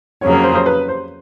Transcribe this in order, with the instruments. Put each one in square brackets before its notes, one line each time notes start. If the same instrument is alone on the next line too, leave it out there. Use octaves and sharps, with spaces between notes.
[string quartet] F2 C#3 F#3 A#3 [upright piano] C#5
[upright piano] C#5
C5
C5
B4
C5